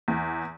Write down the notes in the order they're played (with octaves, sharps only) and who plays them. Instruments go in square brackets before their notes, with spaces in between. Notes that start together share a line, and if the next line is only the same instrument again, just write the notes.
[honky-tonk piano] E2